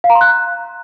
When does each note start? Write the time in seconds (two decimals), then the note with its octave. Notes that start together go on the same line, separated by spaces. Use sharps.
0.04 F5
0.10 A#5
0.15 C6
0.21 F#6